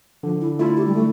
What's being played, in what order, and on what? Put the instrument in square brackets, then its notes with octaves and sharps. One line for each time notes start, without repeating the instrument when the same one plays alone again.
[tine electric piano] D3 [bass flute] F3
[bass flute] E4
[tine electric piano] A3 E4 A4 [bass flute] F4
[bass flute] G4
G3
A3